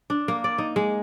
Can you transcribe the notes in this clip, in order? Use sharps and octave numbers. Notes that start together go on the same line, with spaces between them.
D4
A#3
D5
D#4
G#3